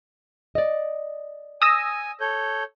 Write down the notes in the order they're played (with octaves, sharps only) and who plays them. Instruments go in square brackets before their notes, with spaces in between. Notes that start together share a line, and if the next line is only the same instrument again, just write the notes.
[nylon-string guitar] D5 D#5
[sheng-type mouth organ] G#5 [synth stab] D#6 E6 A#6
[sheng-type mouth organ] A4 C#5 G6